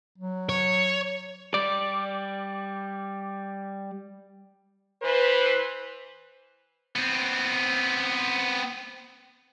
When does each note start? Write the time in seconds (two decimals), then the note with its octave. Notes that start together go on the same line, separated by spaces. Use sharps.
0.18 F#3
0.49 C#5
1.54 G3 D5
5.02 E3 B4 C5
6.96 B3 C4